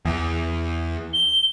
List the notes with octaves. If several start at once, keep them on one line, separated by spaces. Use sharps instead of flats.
E2
G7